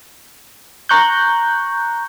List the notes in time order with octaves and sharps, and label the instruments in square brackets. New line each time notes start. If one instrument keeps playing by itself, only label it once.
[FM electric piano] A#5 C#6 F#6 G6